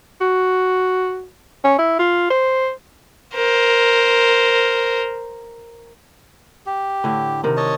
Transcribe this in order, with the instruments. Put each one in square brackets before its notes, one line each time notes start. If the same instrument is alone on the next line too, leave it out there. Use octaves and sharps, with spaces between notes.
[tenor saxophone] F#4
C#4
E4
F4
C5
[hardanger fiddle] A#4 C5
[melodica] G4
[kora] A2 D3
C3 D#3
[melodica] C#5 D#5 A5